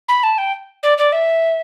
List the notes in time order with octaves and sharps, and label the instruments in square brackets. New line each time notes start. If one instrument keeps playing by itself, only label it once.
[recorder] B5
A5
G5
D5
D5
E5